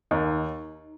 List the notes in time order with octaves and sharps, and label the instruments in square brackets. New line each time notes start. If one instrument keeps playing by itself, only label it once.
[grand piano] D#2 [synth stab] D#4